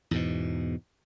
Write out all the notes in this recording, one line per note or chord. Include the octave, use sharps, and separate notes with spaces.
E2 G#2 B2